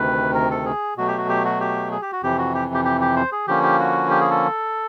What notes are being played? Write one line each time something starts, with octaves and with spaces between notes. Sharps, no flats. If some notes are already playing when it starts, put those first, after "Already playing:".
Already playing: D2 C3 D#3 B4
A#4
A4
G#4
B2 F#3 A3 F#4
G4
F#4
G4
F#4
G4
G#4
G4
F#4
F2 C3 E3 G4
F#4
G4
G4
G4
G4
C5
G#4
D3 F3 A#3 C#4 G4
G4
F#4
G4
G#4
A4